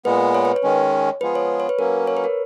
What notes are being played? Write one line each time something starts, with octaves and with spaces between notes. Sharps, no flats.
A#2 G#3 B3 B4
C#5
B4
C#5
D#3 G#3 C#4
F3 G#3 B3 F4 G#4 B4
C#5
C#5
B4
F#3 A#3 C#4 A#4
C#5
B4
A#4